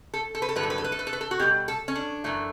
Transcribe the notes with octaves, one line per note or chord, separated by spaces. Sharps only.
A4
A4
B4
A4
G2 D3 F#3 A3 B4
A4
B4
A4
B4
A4
B4
A4
B4
A4
F#4
B2 G3 G4
A4
C#4
D4
F#2 E3 A3